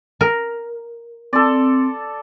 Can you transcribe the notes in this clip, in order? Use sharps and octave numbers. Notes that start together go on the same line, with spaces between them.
A#4
C4 A4 D5